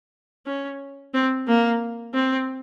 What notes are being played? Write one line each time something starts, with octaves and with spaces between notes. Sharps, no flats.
C#4
C4
A#3
C4